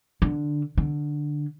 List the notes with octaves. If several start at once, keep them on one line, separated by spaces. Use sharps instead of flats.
D3
D3